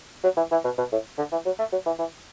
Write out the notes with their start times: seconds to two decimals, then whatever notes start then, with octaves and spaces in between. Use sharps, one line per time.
0.23 F#3
0.37 E3
0.51 E3
0.64 B2
0.78 B2
0.92 A2
1.18 D3
1.32 E3
1.46 F#3
1.59 A3
1.72 F#3
1.86 E3
1.99 E3